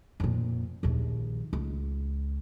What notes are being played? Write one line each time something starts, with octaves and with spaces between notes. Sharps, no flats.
F2 A#2
A#1 D#2
C#2